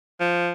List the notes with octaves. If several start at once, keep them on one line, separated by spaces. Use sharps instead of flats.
F3